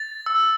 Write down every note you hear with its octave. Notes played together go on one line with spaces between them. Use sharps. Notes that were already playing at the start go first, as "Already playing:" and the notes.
Already playing: A6
E6